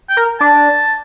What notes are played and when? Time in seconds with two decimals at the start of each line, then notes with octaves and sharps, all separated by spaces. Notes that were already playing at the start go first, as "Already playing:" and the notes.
0.09 G5
0.17 A#4
0.40 D4 A5